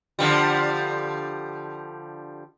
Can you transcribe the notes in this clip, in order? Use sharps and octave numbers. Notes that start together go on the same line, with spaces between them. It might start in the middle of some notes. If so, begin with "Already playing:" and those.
D3 F3 G3